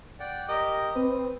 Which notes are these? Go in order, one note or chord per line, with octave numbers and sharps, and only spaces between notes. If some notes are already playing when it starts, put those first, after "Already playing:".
D5 F#5 G5
G4 A#4 D#5
C4 B4 D#6